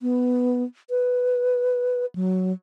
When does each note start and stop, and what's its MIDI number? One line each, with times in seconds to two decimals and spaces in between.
0.01 0.63 59
0.90 2.06 71
2.15 2.53 54